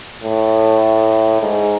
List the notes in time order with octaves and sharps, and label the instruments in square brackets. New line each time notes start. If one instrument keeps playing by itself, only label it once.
[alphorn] A2
G#2